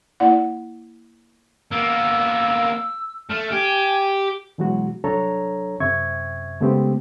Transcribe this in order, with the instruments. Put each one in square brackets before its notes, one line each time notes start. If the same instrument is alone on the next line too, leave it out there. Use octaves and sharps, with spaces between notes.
[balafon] A#3 E4 D5 F#5
[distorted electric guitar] A#3 B3 [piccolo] E6
[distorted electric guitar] A3 [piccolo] F6
[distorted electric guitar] G4 [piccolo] G#5
[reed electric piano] B2 E3 F#3 G#3 F#4
C2 F#3 D4 A4 C#5 A#5
F#2 C3 C4 E5 C#6 G#6
C#3 G#3 A3 B3 C4 G4